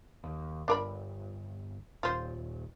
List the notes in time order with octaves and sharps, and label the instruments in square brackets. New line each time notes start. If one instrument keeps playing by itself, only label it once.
[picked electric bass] D#2
[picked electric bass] G1 [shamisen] D4 A#4 B5
[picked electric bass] D#1 [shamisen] F4 C5